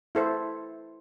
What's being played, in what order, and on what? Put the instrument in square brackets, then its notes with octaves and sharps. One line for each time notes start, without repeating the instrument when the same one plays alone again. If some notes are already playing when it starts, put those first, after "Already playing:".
[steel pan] E4 A4 C5